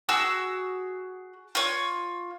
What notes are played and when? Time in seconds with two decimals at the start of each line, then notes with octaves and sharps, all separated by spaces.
0.09 F#4 G#4 E6
1.55 F4 C#5